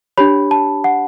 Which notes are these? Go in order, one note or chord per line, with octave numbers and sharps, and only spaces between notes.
D4 G4 C#5 B5
A5
F#5